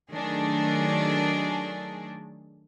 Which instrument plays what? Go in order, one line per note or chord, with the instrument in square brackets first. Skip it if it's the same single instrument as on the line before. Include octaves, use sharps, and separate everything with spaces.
[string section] D#3 F#3 A3 D4 G#4